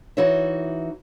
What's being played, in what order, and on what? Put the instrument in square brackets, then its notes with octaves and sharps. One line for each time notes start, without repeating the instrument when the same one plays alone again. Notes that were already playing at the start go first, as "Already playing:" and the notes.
[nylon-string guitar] E3 D#4 F#4 C#5 D#5 E5